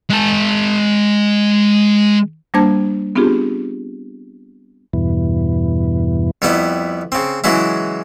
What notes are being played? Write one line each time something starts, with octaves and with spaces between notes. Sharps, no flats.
G#3 A5
G3 A#3 D4 C5 A5 G#6
B3 C4 D4 F4 G4 G#4
E2 G2 B2 E3
F2 G3 B3 E4
C#3 C4
C#3 E3 F#3 G#3 E4